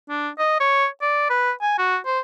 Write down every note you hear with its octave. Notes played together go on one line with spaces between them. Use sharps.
D4
D#5
C#5
D5
B4
G#5
F#4
C5